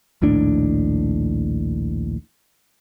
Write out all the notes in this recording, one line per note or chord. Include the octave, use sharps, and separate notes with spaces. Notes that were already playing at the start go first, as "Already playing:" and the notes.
A#1 D#2 A2 D4